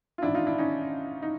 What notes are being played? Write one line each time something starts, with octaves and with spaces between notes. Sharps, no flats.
F4
A1 G#2 D#3 D4 E4
D#4 F4
D4 E4
C#4 D#4
D#4